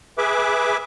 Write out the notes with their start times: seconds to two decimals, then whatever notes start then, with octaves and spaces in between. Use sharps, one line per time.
0.18 G#4 B4 E5 D6